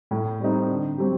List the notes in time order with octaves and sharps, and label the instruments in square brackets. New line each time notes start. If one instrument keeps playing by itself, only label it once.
[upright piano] A2
G3 C4 D#4
D3
F#3 C4 G4